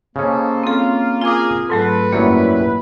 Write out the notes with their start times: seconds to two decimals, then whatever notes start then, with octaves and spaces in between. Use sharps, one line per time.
0.16 C#3 A#3 C#4 A4 C5 D#5
0.63 C4 F4 A4
1.21 F4 G#4 A#4 G#5 D6
1.70 G#2 F#3 A3 A4 B4
2.12 F#2 F#3 G3 A#3 E4